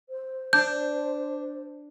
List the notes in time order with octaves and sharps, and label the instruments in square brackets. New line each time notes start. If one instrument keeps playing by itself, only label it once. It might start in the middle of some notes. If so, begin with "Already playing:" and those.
[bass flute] C5
[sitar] D4 [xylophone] G6